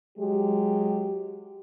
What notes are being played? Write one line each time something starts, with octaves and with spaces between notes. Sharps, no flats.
F#3 G#3 G4